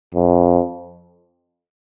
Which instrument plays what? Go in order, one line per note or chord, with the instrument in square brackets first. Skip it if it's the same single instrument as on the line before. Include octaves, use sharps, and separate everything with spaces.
[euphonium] F2